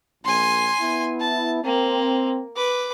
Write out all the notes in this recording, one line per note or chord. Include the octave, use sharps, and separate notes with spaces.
A#1 G#5 C6
B3 E4
A5
A#3 C4
B4 D6